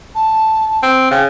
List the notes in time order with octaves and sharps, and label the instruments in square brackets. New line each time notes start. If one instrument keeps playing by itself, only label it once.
[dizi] A5
[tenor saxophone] C4
[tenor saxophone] C#3 [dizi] G5